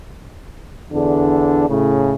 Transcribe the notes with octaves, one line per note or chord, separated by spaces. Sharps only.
E2 D3 D4
A2 C#3